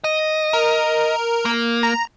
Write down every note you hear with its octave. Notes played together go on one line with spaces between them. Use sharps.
D#5
A#4
A#3
A#5